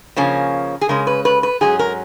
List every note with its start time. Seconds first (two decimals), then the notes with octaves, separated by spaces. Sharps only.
0.17 C#3 F3 A#3 C#4
0.81 G#4
0.89 C#3 G#3 C#4 A#4
1.07 B4
1.25 B4
1.43 B4
1.61 G#2 F#3 C#4 G#4
1.79 A#4